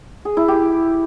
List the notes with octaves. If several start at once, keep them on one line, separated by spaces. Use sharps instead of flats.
G#4
E4
G4